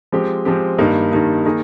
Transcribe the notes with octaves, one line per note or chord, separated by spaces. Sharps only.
F3 G#3 C4 G4
F3 G#3 C4 G4
G2 D#3 G3 A#3 D#4
G2 D#3 G3 A#3 D#4
D#3 A#3 D#4 G#4